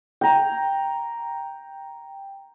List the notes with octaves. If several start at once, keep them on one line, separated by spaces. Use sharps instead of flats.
G5 A#5